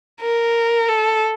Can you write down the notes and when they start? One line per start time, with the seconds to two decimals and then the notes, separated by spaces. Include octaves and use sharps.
0.21 A#4
0.88 A4